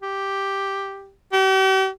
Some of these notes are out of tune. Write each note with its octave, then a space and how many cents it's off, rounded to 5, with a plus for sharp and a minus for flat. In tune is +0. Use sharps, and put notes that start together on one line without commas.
G4 +0
G4 -45